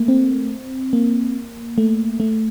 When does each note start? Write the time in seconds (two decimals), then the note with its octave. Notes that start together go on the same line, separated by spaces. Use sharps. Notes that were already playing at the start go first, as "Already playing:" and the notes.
Already playing: A3 A#3
0.08 C4
0.93 A#3
1.78 A3
2.20 A3